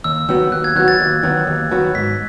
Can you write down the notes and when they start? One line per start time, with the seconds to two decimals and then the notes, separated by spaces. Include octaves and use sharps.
0.04 D#2 E6
0.29 D#3 F#3 B3 F#4 E6
0.52 D#2 F#6
0.64 G#6
0.75 D#3 F#3 B3 F#4 F#6
0.88 A6
1.00 D#2
1.23 D#3 F#3 B3 F#4
1.47 D#2
1.71 D#3 F#3 B3 F#4
1.95 G#2 B6